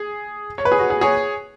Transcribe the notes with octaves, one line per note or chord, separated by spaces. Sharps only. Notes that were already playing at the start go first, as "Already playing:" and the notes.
Already playing: G#4
C#5
B4
G#4
F#4
G#4
G#4 C#5